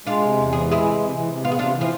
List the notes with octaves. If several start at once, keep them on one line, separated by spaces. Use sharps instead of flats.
G#3 D4 F4
C3
E2
E3 G#4
G#3 E4 G#4
C3
C3
E3
C3
B3 F4
G#4
C3 D4 F4
E3
F3